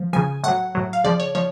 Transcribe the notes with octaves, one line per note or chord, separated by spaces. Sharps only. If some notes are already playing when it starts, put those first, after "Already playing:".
Already playing: F3
C#3 F3 G#5
A2 F#3 F#5
A2 F#3
F5
C#3 F3 D5
C#5
F3 C#5